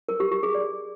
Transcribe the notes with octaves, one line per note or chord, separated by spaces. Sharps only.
A#4
G4
G4
G#4
D5